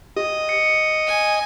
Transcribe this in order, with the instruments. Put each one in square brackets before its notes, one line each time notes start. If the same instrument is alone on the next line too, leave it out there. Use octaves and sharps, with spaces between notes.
[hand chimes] G4 [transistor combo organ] D#5
[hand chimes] C#7
[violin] G#5